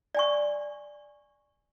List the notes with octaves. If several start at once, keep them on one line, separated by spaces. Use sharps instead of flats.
D5 G#5 C#6